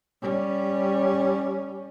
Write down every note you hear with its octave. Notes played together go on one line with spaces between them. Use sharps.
G3 C#4